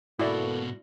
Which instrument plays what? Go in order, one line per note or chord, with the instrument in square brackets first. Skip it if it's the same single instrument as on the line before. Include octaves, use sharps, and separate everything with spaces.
[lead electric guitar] G#2 B2 [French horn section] A#3 B3 A4 [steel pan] E4 D5 [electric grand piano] F#4